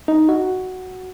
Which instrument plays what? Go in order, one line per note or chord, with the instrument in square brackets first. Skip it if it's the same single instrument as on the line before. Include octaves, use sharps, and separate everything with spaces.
[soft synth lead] D#4
F#4